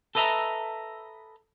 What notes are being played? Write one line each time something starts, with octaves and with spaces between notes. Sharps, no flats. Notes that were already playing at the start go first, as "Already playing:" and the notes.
A4 B4 D#5 E5 A#5